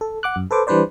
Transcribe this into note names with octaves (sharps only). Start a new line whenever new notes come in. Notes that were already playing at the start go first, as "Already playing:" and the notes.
A4
F#5 D6 F#6
F#2
A4 B4 C5 D6
E3 G3 D4 B4 C5 D5